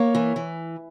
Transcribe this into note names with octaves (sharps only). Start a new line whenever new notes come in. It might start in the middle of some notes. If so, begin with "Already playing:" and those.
Already playing: A#3 C#5
E3
E3